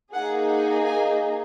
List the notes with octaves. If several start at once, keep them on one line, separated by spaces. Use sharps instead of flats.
A#3 D#4 G#4 F#5
F#5
G#5